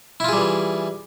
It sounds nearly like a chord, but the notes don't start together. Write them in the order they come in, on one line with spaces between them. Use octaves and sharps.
E4 F4 G#4 G3 E3